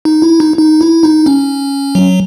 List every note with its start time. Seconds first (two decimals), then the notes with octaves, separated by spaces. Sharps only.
0.05 D#4
0.22 E4
0.40 D#4
0.58 D#4
0.81 E4
1.03 D#4
1.26 C#4
1.95 F#3